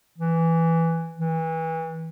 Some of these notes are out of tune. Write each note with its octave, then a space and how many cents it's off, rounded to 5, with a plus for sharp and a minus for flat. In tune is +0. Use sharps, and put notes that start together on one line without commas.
E3 +5
E3 -25